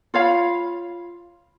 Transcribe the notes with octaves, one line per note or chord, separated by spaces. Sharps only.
F4 C#5 F5 B5